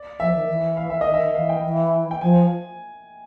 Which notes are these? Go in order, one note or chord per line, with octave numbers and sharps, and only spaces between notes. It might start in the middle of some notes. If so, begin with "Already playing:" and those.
Already playing: D5
F3 E5
D#3
E3
F5
E5
D#3 D#5
E5
D#3
E3 F5
G5
E3
G5
F3 G#5